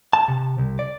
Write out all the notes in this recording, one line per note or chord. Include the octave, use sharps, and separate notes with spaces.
A5
C3
C2
D5